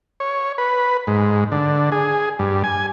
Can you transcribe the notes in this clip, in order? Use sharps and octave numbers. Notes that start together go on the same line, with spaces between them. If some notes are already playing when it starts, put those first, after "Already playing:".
C#5
B4
G#2
D3
G#4
G2
G#5